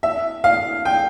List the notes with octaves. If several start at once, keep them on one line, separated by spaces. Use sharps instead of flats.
E5
F5
G5